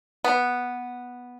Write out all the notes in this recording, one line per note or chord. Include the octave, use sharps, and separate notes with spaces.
B3